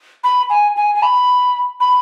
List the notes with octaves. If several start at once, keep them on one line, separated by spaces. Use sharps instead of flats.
B5
G#5
G#5
G#5
B5
B5